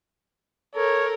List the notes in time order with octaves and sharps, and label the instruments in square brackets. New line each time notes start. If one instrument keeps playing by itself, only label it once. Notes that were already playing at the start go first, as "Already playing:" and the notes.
[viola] A4 A#4 [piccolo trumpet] C#5